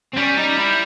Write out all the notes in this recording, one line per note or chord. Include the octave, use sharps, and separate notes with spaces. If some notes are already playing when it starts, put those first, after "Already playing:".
C4
G3 C#4
D#4
E4